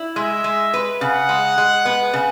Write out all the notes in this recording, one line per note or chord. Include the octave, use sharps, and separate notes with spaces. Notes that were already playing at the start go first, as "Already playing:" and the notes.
Already playing: E4
G#3 E5
G#3
B4
C#3 F#5
G#3
G#3
B3
C#3